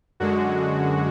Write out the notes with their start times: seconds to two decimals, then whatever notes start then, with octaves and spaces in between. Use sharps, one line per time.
0.20 F#2 D3 G#3 F#4